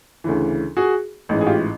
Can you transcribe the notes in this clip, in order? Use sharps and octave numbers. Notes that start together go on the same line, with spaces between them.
D2 C#3 E3
F#4 G#4
A1 G#2 E3
G#4
F4 G4